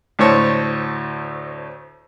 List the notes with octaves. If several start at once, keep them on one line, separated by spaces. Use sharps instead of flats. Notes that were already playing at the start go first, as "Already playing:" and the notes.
D2 A2 C5 C#5 A5